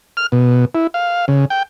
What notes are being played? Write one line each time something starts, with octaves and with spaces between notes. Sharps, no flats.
F6
B2
E4
F5
C#3
G5